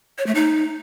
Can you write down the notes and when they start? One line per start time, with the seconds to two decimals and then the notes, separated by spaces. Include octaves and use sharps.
0.18 C#5
0.27 A3
0.35 D#4